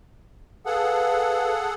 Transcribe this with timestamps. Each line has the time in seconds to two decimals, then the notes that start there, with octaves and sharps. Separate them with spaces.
0.66 G#4 A4 B4 F5 F#5